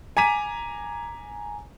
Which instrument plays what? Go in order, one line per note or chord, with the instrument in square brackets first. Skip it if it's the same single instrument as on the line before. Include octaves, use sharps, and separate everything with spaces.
[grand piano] G#5 A#5 D6 B6 D#7